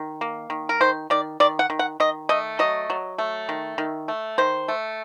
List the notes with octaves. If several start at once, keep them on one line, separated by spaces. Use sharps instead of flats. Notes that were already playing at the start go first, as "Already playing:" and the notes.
Already playing: D#3
A#3
D#3
A#4
D#3 C5
D#3 D5
D#3 D5
F#5
D#3
F#5
D#3 D#5
A3 D#5
F#3 D#5
F#3
A3
D#3
D#3
A3
D#3 C5
A3